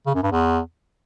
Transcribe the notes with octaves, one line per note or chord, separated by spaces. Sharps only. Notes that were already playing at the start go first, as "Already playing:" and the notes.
C#3
F#2
G2
E2